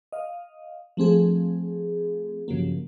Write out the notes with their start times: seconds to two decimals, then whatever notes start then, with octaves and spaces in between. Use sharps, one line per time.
0.12 D#5 F5
0.97 F3 A3 C4 G#4
2.48 G2 C#3 F3 F#3 A#3